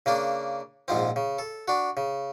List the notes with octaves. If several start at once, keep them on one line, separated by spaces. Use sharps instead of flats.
C#3 A#3 D4
A#1 G#2 F3 C4
C#3
A4
D4 F#4
C#3